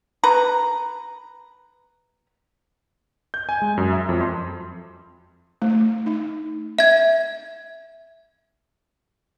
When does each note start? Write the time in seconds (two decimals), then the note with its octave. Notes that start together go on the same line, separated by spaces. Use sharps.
0.24 B4 A#5
3.34 G6
3.49 G#5
3.62 G#3
3.77 F#2
3.93 E5
4.09 F2
4.21 C6
5.62 A3
6.06 D#4
6.79 E5 G#6